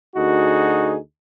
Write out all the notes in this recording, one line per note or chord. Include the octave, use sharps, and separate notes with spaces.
D2 D#4 F#4 G#4